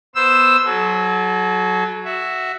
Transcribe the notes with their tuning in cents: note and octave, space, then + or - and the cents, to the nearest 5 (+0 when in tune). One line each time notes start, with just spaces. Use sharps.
B3 +0 C5 +0 E6 +0
F#3 +0 A4 -40
F#4 +0 E5 +0